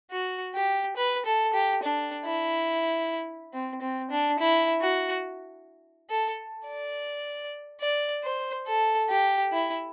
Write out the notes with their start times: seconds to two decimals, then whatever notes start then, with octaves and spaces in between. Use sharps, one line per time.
0.11 F#4
0.55 G4
0.96 B4
1.25 A4
1.53 G4
1.83 D4
2.25 E4
3.53 C4
3.81 C4
4.10 D4
4.39 E4
4.81 F#4
6.10 A4
6.67 D5
7.81 D5
8.23 C5
8.67 A4
9.10 G4
9.52 E4